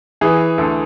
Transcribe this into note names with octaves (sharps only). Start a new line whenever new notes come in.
E3 G#4
D2 A4